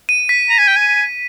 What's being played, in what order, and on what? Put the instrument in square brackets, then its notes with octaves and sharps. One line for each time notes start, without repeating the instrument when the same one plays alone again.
[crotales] D#7
B6
[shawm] A#5
G#5
G5
G#5